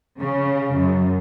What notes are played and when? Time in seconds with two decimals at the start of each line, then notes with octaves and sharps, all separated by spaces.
0.18 C#3
0.74 F#2